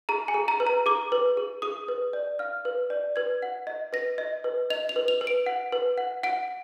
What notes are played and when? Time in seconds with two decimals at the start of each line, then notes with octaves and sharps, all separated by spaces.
0.09 G#4 A#5
0.28 G#5
0.34 G#4
0.48 A#5
0.60 B4
0.67 A#5
0.86 G#4 D6
1.12 B4
1.37 G#4
1.62 G#4 D#6
1.88 B4
2.13 D5
2.39 F5 F6
2.65 B4
2.90 D5
3.16 B4 G#6
3.42 F#5
3.67 D#5
3.93 B4 A#6
4.18 D#5
4.44 B4
4.70 D#5 F7
4.89 F7
4.96 B4
5.08 F7
5.21 B4
5.27 D7
5.46 F#5
5.72 B4
5.98 F#5
6.23 F#5 D7